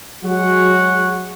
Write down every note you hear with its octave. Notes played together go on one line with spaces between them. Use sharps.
F#3 G#3 F#4 G#4 C#5 F#5